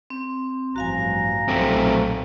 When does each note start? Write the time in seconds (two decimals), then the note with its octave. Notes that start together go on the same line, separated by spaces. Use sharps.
0.10 C4
0.76 A1 G2 F3 F#4 F5 G#5 A#5
1.48 B1 A#2 F#3 A3 C4